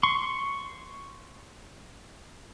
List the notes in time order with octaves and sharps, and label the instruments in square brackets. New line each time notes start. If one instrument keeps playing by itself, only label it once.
[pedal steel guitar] C6 C#6